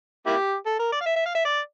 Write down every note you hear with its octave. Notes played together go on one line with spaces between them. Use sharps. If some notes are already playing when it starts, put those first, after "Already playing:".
A#3 E4 G4
A4
A#4
D5
F5
E5
E5
F5
E5
D5